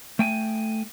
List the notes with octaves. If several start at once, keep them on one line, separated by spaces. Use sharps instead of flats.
A3 G5 G#5